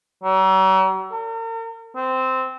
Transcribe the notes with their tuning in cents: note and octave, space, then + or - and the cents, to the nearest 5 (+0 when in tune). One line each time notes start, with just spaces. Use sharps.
F#3 +45
A#4 -40
C4 -10